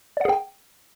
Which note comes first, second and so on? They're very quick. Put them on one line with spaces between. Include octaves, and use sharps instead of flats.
D5 F#5 G#4 G5